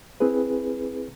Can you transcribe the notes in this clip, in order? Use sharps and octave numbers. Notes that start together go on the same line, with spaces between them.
C4 E4 G#4 B4